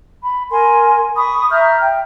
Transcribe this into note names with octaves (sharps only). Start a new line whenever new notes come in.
B5
A#4 G#5 C6
B5 C#6 D#6
E5 A#5 F6 G6
G5